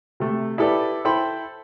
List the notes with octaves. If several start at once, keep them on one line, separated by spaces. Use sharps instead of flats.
C3 A3
E4 G4 A4 B4 D5
E4 A4 C5 G5 B5 C6